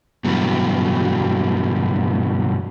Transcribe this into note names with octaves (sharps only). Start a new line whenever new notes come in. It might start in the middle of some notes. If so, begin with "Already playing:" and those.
G2 B2 E3 F#3